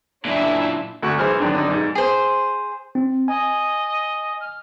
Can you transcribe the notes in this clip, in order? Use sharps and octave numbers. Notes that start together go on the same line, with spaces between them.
F#2 A#2 D4 E4 E5
D2 A3 F#4 C#6
B1 E3 G#4 C5 F6
F#2 D3 D#3 D4
D3 D#4
B1 G#2
G#4 C5
C4
D#5 G#5
F6